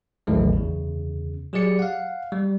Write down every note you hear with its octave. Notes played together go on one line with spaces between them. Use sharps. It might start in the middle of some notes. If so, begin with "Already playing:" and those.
A1 D#2 A2 D#3 F#3 G#3
E2 C#3
F#3 G4 G#4 D5 C#7
F5 F#5
G3